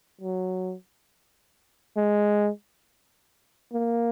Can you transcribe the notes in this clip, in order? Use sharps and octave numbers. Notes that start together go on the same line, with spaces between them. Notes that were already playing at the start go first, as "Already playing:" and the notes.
F#3
G#3
A#3